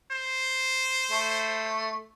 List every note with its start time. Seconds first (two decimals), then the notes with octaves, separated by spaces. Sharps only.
0.12 C5
1.11 A3